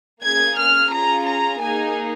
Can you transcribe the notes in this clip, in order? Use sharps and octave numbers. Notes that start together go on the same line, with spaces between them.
A#3 C#4 G#4 G#6
F6
C#4 F4 G#4 A#5
A#5
A#3 D#4 G#4 G#5